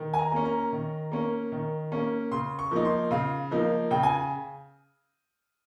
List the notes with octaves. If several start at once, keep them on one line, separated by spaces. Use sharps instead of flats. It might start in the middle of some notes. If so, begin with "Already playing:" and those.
Already playing: D#3
G#5
A#5
A#3 C#4
A#5
D#3
A#3 C#4
D#3
A#3 C#4
C#3 C6
C#6
F3 A#3 D#4
C6
C#3 F5
F3 A#3 D#4
C#3 G5
G#5